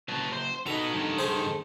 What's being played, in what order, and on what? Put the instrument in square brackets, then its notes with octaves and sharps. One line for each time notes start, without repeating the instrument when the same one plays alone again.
[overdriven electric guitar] F#2 C#3 [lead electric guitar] B4 A5
[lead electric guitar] C5
[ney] D#4 [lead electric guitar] F#4 B4 [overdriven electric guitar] A4 D#5 [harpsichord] A#5
[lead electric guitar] G2 D#3
[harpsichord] G#4 C5